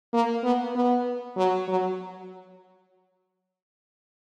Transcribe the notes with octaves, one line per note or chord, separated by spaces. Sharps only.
A#3
B3
B3
F#3
F#3